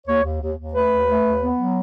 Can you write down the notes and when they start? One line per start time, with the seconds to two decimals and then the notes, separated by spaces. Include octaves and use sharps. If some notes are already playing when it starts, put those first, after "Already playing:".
0.07 D#2 C#5
0.24 D#2
0.42 D#2
0.57 D#2
0.74 A3 B4
0.90 D#2
1.07 A3
1.24 D#2
1.41 B3
1.58 F#3